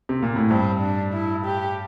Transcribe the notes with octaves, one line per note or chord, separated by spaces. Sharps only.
C3
A#2
A2
G2 C4
D4
E4
G4